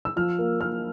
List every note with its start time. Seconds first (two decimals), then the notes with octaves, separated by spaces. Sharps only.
0.05 E6
0.16 F3 F6
0.39 A#3
0.61 A#3 F6